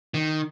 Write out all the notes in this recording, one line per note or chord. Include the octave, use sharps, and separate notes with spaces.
D#3